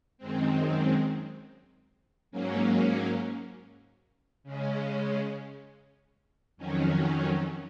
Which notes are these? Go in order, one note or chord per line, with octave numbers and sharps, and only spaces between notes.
F#2 D#3 G#3 C4
G#2 F#3 A#3 C#4
C#3 G#3 C#4
F2 D#3 F#3 C#4